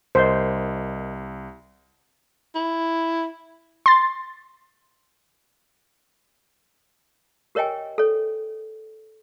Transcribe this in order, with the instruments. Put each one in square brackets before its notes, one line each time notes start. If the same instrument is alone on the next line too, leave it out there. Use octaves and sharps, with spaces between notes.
[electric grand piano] C2 [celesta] A#4 D#5 [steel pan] C5
[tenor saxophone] E4
[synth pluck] C6 A6
[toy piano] G4 A#4 C#5 D#5 G5 G#5
A4 C#5